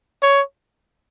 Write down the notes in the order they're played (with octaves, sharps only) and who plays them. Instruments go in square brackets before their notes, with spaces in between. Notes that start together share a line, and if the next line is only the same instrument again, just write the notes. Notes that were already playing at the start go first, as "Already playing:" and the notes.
[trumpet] C#5